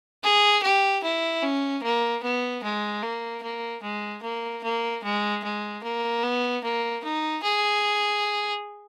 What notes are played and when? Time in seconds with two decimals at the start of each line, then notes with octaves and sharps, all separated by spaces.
0.23 G#4
0.63 G4
1.03 E4
1.43 C#4
1.82 A#3
2.23 B3
2.64 G#3
3.03 A#3
3.43 A#3
3.83 G#3
4.23 A#3
4.64 A#3
5.04 G#3
5.44 G#3
5.84 A#3
6.23 B3
6.63 A#3
7.04 D#4
7.43 G#4